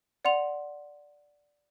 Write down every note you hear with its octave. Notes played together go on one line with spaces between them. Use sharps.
D5 F#5 C6 F7